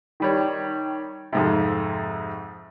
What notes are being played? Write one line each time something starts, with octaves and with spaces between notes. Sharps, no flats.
D#3 G3 C#5
F2 G#2 C3